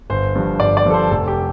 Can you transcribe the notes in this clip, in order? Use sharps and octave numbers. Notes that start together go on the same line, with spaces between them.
G1 C5
G2 F3
G1 D5
D5
G2 F3 A4
C5
F1 A4
G4